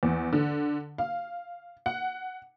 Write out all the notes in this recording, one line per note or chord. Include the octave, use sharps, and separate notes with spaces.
E2
D3
F5
F#5